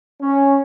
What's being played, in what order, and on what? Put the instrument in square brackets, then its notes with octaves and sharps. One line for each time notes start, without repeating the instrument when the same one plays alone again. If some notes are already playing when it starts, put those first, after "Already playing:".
[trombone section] C#4